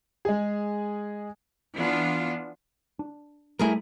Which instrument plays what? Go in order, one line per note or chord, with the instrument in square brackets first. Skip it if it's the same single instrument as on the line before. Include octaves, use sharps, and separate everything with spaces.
[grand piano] G#3 G#4
[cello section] E3 B3 D4 F4
[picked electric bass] D4
[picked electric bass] G3 A3 [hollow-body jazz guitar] E4 G#4 A#4